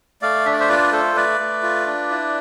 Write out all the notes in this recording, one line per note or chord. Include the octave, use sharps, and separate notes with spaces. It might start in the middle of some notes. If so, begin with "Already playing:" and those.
A3 D5 F5
D4 E5
D5
C5 E5
F4 B4 D5
A3 A4 C5
A3 B4 D5
A3
F4
D4
E4